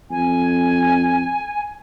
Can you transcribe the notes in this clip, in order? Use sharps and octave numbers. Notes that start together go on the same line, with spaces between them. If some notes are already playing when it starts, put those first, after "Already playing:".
F2 G#5